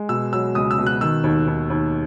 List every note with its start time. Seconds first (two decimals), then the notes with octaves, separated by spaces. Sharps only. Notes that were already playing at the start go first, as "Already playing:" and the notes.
Already playing: G#3
0.09 B2 E6
0.32 F#3 E6
0.55 C#2 D#6
0.71 E6
0.78 B2
0.86 F#6
1.01 D#3 E6
1.24 D#2
1.47 D#2
1.70 D#2